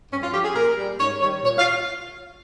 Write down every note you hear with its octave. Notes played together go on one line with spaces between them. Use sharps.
G2 C#4
F4
F3 G4
G#4
A#2 A#4
G3
G#2 C#5
D#3 G3 C#5
A#2 C#5
F5